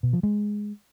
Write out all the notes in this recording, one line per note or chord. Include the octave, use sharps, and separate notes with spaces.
B2
F3
G#3